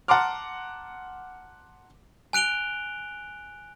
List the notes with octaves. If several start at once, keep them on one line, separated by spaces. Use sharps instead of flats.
F#5 A5 A#5 C6 D6 F6
G#5 F#6 D7 F7 G7